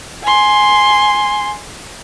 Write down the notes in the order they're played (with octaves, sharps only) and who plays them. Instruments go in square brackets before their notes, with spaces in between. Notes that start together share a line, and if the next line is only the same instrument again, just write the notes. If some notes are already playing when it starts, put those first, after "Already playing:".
[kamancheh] G#5 C6